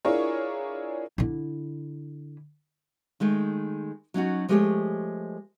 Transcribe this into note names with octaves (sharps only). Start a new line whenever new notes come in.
D4 E4 F4 G#4 A#4 C#5
D3 E4
D#3 G#3 A3
F#3 C#4 D#4 F#4
F3 G#3 A3 G4 G#4 C#5